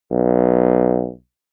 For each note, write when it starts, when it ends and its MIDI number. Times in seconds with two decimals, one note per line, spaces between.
0.11 1.10 35